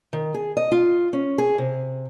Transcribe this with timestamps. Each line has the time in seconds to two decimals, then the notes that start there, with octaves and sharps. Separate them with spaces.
0.13 D#3
0.34 G#4
0.57 D#5
0.72 F4
1.13 C#4
1.38 G#4
1.58 C3